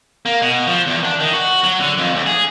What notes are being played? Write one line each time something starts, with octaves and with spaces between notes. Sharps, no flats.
A#3
B2
F3
E2
D4
D#3
F#4
F#3
D3
F2
D2
G#4